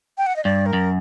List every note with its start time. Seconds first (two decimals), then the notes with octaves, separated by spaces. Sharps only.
0.18 G5
0.26 F#5
0.36 D#5
0.44 G2 D5
0.66 A#4
0.73 F#2